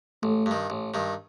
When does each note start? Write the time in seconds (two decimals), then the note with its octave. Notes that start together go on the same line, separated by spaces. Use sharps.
0.23 A1 A3
0.46 G2 D#3
0.70 A1
0.94 G2 D#3